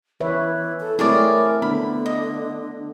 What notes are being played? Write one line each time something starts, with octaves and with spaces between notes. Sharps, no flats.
E3 B4 C#5 E5
A4
A3 C4 E4 G#4 A#4 C#5 D5
D3 B3 B5
D#5